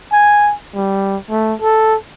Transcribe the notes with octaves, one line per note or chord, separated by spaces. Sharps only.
G#5
G3
A3
A4